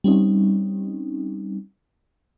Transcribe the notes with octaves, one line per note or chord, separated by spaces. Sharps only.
G3 C4 C#4 D#4